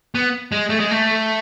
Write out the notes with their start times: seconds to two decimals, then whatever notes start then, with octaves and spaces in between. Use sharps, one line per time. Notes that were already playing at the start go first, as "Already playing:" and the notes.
0.15 B3
0.52 G#3
0.69 A3
0.80 G#3
0.91 A3